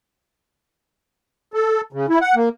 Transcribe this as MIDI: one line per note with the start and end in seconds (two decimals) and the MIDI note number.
1.54 1.81 69
1.93 2.06 49
2.09 2.19 64
2.21 2.35 78
2.35 2.49 58